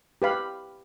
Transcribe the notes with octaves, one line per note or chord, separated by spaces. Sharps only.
G4 B4 F5 B5